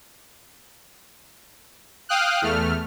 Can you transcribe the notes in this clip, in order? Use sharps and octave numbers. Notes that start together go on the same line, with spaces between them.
F5 G5 D#6 F6 F#6
E2 A3 F6